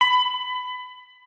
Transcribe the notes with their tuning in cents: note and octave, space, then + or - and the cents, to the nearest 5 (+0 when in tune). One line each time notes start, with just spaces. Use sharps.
B5 +25